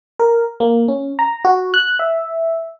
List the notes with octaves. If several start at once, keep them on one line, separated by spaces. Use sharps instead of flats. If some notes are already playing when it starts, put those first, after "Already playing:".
A#4
A#3
C#4
A#5
F#4
F#6
E5